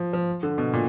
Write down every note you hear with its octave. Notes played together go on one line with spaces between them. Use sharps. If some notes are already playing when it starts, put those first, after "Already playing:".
Already playing: F3
F3
D3
B2
A#2